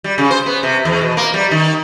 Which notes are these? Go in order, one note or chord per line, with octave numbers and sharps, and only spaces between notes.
G3
C#3
C5
B3
C3
E2
B2
A#3
G3
D#3